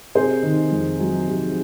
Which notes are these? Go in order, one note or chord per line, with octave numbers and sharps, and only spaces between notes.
C3 G#4 C5
D#3
F2
F#3
C3